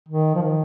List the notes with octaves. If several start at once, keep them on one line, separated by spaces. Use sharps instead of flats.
D#3
F3
D#3